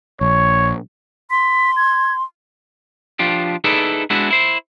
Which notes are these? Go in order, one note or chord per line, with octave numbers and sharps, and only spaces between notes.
A#1 C#5
C6 B6
G#6
F3 D4 F4 G4
D#4 E4 G#4 A4 B4 D5
G#3 B3 D4 E4 F#4
E4 C5